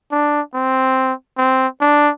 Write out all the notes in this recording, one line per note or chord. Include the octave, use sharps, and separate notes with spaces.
D4
C4
C4
D4